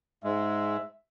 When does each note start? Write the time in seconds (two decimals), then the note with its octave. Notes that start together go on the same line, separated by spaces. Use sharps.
0.24 G#2 G#3 E5